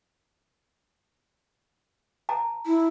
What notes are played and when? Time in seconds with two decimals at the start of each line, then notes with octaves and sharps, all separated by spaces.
2.29 A5 A#5
2.66 E4